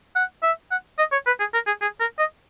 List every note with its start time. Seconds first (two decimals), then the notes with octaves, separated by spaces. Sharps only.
0.16 F#5
0.43 E5
0.71 F#5
0.99 D#5
1.12 C#5
1.27 B4
1.40 G#4
1.54 A#4
1.67 G#4
1.82 G#4
2.00 A#4
2.19 D#5